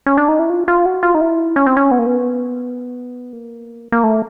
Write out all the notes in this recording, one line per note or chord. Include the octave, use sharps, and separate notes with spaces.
C#4
D4
D#4
E4
F4
F4
F#4
F4
D#4
E4
C#4
C4
C#4
B3
A#3
B3
A#3
A#3
A3